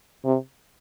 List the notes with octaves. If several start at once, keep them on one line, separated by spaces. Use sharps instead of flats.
C3